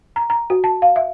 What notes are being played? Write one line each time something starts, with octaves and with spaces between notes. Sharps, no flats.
A#5
A#5
F#4
A5
F5
E5